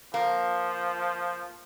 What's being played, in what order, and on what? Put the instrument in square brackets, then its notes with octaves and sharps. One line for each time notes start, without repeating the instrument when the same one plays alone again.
[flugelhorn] F3 [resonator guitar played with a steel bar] A#3